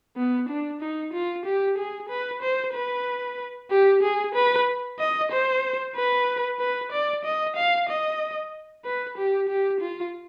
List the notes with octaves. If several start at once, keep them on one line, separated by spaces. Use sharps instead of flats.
B3
D4
D#4
F4
G4
G#4
B4
C5
B4
G4
G#4
B4
D#5
C5
B4
B4
D5
D#5
F5
D#5
B4
G4
G4
F4